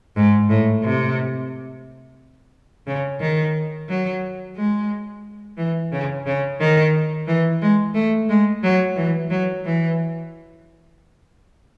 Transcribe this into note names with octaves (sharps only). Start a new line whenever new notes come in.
G#2
A2
C3
C#3
D#3
F#3
G#3
E3
C#3
C#3
D#3
E3
G#3
A3
G#3
F#3
E3
F#3
E3